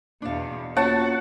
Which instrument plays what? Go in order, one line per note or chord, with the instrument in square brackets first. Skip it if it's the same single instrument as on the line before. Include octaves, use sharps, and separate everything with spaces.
[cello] E2 B2 [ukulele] D4 F5
[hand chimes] A#3 C#4 F4 [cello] F#4 [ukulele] C#5 [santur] F#5 A5